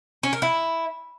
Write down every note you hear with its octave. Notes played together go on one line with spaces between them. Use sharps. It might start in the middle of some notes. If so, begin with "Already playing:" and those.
C#4
A#4
E4